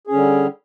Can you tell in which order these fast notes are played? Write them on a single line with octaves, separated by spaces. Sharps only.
G#4 C#4 D3 G3